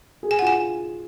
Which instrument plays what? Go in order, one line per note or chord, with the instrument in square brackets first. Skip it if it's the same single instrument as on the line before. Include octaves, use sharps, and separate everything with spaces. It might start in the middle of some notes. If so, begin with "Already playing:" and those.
[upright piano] G#4
[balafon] G#5
F#5
[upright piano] F4 [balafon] G#5